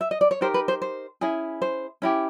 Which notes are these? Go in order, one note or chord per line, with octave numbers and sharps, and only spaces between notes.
E5
D#5
D5
C#5
D#4 G4 A#4 C5
B4
C5
C5
C#4 E4 G#4
C5
C#4 E4 G4